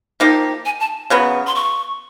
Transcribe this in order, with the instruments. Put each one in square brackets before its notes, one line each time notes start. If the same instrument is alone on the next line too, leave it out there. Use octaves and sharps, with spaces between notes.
[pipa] F3 A#3 D#4 G4
[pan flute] G#5
A5
[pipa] C#3 F#3 B3
[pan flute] C6
C#6